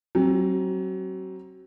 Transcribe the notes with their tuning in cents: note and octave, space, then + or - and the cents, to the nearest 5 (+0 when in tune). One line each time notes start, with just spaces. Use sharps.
F#3 +30 C4 +35